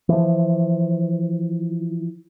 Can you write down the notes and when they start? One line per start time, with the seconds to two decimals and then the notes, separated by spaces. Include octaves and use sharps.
0.09 E3 F3